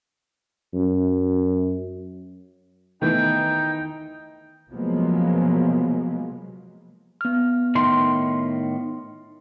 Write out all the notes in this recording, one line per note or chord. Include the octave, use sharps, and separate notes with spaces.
F#2
D#3 E3 A3 B3 D#4 G5
C3 F3 F#3 G#3 A#3 B3
B3 F6
A2 D#3 C6